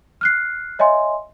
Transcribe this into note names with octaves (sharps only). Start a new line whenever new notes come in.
F6 F#6 C7
C#5 D#5 E5 G#5 C6